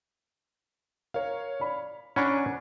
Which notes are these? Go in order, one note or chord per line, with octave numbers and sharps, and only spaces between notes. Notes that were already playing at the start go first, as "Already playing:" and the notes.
A#4 C#5 F5
D5 B5
C#4 D4 F#5 G#5 A#5 B5 C#6